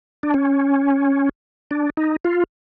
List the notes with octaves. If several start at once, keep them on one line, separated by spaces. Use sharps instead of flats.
D4
C#4
D4
D#4
F4